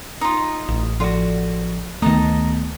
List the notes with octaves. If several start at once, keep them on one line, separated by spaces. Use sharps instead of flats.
D#4 F4 D#6
A1
F3 F4 F#4 A4 D5
D2 D#3 A3 B3 D#4 D#5 A5